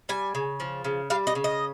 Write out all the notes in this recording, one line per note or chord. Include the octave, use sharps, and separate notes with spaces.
G3 G#5
C#3
F3
C#3
G3 F5
D#5
C#3
D#5